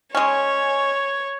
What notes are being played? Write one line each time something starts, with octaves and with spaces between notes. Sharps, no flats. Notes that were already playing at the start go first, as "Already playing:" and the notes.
G#3 C#4 C#5